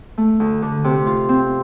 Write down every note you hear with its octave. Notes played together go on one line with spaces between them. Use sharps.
A3
D2
D3
C3
F4
C4